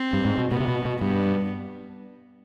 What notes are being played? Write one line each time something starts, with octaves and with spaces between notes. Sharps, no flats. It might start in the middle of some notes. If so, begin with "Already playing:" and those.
Already playing: C4
G2
G#2
B2
B2 B3
C3
B2
B2
G2 B3